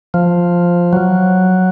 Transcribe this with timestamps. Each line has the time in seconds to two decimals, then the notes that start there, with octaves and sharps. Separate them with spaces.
0.14 F3
0.93 F#3